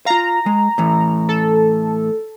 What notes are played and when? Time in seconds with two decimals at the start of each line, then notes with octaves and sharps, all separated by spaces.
0.06 F4 F5 A#5
0.46 G#3
0.78 A2 E3
1.28 A4